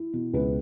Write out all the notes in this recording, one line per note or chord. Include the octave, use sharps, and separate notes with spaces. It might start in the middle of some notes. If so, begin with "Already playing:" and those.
Already playing: E4
B2
C#2 B4